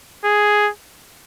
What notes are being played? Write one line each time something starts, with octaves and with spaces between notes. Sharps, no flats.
G#4